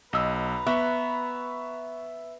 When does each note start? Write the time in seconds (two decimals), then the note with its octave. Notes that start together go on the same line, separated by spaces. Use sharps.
0.13 B1 B4 D#5 A#5 E6
0.67 B3 E5 C#6